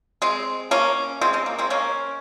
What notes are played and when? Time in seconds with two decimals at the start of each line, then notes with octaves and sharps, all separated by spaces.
0.22 G#3 C4
0.71 A#3 C#4
1.21 G#3 C4
1.33 G#3 C4
1.46 A#3
1.59 G#3 C4
1.70 A#3 C#4